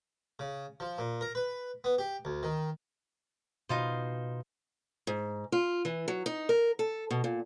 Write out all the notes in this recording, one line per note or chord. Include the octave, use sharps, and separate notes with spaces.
C#3
F3
A#2
A#4
B4
B3
G4
D2
D#3
B2 D#4 F4 C5
G#2
F4
E3
F#3
D#4
A#4
A4
B2
A#2